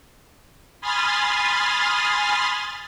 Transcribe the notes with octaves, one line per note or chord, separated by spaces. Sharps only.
G#5 B5 C6 D#6 F6 A6